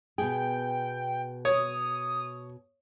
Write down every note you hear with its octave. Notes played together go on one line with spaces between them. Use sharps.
B2 G#4 G5
C#5 D#6